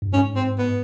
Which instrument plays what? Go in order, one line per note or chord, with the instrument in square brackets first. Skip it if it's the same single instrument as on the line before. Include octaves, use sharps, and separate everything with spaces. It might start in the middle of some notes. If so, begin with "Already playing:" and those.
[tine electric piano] G2
[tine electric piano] G#2 [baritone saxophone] C#4
[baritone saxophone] C4
B3